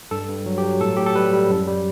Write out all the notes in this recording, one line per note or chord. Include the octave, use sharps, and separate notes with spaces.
G2 A4
G2
F#3
G4
F#3
A2 A4
A2 G4
A4
G3 B4
G3
F#2
G3